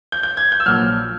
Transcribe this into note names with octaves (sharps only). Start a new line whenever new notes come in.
G6
G6
G#6
G6
E6
A#1 A#2 F#3 F6